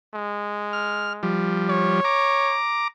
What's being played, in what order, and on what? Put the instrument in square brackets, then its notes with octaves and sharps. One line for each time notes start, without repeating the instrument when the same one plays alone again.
[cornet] G#3
[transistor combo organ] F6
F3 G3
[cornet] C#5
[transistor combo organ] A#5 D6